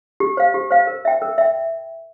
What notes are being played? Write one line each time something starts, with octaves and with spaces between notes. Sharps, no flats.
G4
C5 F5
G4
C5 F5
A#4
E5 G5
A#4
E5 G5